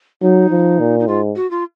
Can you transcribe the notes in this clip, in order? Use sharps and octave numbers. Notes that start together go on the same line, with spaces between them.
F#3 D#4
F3
A#2
D#4
G#2 F4
F#4
F4